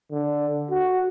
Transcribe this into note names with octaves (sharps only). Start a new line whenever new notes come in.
D3
F#4